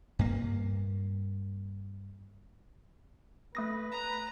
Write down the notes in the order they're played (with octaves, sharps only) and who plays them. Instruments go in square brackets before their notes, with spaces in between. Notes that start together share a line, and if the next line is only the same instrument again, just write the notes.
[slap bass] G2 A#3
[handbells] A3 D#6 A#6 [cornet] B4
[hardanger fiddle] A#5